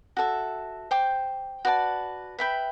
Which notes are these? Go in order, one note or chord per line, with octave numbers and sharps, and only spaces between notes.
F#4 A4 E5
C5 G5 D6
F#4 B4 D5 A5
B4 E5 G5 B5